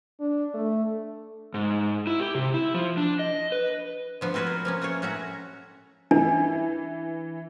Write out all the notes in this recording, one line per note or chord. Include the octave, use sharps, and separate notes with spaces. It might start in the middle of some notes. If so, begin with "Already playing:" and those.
D4
A3
G#2
E4
G4
C3
E4
F3
D4
D#5
B4
D3 F3 B3
C4 F4 F#4 B4 C#5
A#4
F3 A#3 C#4
A3 F4 C5 C#5
A2 C#4 F#4 E5 A#5
E3 D4